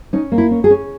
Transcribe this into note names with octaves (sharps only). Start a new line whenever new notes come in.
C#4 D#4
A#3
E4
C#4
G#4
C#4